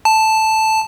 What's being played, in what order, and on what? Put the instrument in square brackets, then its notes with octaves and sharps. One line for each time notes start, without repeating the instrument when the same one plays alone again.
[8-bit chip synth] A5